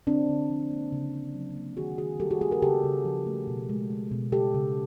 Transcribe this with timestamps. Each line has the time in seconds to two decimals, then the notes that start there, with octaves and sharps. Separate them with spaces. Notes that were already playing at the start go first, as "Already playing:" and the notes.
0.07 D3 C4 D4
0.29 D3
0.50 F3
0.71 A#3
0.92 C#3
1.13 C#3
1.34 F#3
1.56 A#3
1.77 D#3 F#4 G#4
1.98 D#3 F#4 G#4
2.20 G3 G4 A4
2.31 F#4 G#4
2.41 A#3 F#4 G#4
2.51 G#4 A#4
2.62 C#3 G4 A4
2.84 C#3
3.05 F3
3.26 A3
3.47 B2
3.69 G#3
3.90 G#3
4.12 B2
4.32 C#3 G4 A4
4.55 C#3